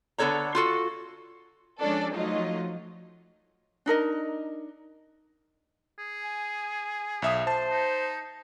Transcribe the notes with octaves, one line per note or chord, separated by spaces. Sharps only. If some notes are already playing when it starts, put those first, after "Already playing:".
D3 B3 A4 C#5 A#5
F4 F#4 A4
F3 G#3 C#4 D4 A4 D5
F3 F#3 A3 D#4 F4 D#5
D4 D#4 A#4 D#5
G#4
G#5
B1 E5 D#6
C5 A5
D#4